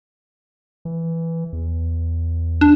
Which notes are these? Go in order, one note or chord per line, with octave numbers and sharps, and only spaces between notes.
E3
E2
D4